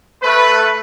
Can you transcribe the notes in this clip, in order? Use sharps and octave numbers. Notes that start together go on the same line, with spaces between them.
A3 B4